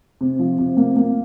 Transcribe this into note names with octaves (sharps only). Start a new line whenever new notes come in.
C3
F3
C3
A#3
A#3